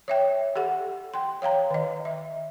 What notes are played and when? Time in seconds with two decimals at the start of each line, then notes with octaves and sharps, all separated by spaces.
0.08 C#5 E5 G5
0.56 G4 A4 F#5
1.14 G5 C6
1.42 C#5 F5 G5 A#5
1.71 D#3 D#5
2.05 E5